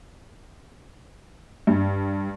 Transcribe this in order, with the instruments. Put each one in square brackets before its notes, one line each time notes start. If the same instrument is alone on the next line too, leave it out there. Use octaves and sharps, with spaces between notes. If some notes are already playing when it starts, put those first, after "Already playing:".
[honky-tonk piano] G2